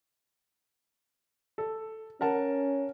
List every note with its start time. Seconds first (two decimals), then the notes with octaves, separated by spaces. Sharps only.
1.58 A4
2.21 C#4 A#4 F#5 A5